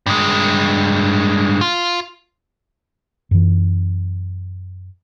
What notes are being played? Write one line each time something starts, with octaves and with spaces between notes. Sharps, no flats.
G2 G#3
F4
F#2 E3